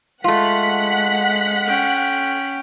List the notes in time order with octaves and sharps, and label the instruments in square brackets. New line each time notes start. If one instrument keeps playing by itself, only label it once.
[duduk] G#3 [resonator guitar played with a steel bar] A3 F4 [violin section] F#5 F#6 B6
[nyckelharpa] C#4 G5